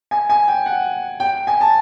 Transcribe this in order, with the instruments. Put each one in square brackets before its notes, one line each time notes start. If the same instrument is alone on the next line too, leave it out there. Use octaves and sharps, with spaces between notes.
[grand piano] G#5
G#5
G5
F#5
G5
G#5
A5